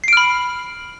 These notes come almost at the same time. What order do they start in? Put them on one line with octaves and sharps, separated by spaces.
C7 D7 F6 B5